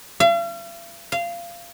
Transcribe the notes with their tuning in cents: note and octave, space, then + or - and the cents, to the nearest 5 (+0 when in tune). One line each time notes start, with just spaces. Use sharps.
F5 -45
F5 -20